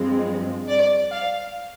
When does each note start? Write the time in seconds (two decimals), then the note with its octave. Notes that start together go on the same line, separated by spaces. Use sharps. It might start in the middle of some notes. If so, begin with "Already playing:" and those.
Already playing: G2 F3 G#3 C4
0.69 D5
1.12 F5